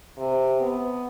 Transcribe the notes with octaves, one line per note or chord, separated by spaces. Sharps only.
C3
B3